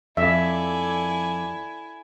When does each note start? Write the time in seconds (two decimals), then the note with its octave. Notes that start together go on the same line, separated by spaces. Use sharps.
0.17 F2 E4 A4 D5 E5 G#5